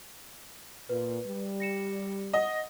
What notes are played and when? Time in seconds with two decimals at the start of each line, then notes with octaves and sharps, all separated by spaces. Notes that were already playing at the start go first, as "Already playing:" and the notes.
0.89 A#2 B4
1.26 G3
1.60 A#6 C#7 E7
2.33 D#5 F#5